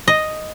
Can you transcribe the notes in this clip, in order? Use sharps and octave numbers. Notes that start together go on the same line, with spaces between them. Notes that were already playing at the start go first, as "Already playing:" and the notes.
D#5